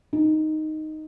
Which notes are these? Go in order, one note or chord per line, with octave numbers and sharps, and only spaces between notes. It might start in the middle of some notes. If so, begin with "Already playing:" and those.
D#4